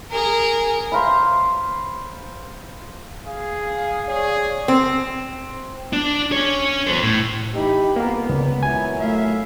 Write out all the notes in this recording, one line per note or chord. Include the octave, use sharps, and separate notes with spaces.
G#4 A#4
C5 F5 A#5 B5
G#4 F5
G#4 C#5 D5
C4
D4
C#4 C#5
A4 C5
A2
E3 D#4 G4 B5
C2 F2 D3 A#3 B3 A#4
C#2
A#2 F#3 E4 G#5
A3 E5 F5